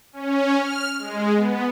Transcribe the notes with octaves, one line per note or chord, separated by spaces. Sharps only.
C#4
F6
G#3
B3